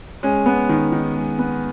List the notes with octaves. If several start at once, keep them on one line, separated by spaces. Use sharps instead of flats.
G#3 C#4
B3
D#3
D#3
G#3
B3